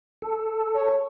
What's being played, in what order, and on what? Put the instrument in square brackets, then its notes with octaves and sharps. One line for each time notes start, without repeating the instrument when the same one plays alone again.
[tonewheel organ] A4
[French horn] C#5